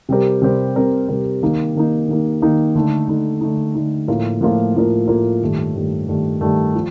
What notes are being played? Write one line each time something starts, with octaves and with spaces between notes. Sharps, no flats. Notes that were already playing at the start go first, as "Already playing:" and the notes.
C3 G3 C4 G4 A#4
C3 G3 C4 G4 A#4
C3 G3 C4 G4 A#4
C3 G3 C4 G4 A#4
D#3 A#3 D#4
D#3 A#3 D#4
D#3 A#3 D#4
D#3 A#3 D#4
D3 A3 D#4
D3 A3 D#4
D3 A3 D#4
D3 A3 D#4
A2 F3 A#3 F4 A#4
A2 F3 A#3 F4 A#4
A2 F3 A#3 F4 A#4
A2 F3 A#3 F4 A#4
G2 D#3 A3
G2 D#3 A3
G2 D#3 A3
G2 D#3 A3
F3